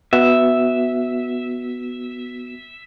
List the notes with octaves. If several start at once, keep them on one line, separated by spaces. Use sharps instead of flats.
B3 F#4 E5